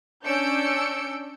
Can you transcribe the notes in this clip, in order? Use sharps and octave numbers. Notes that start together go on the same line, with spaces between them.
C#4 D4 E6 G6 C#7 D7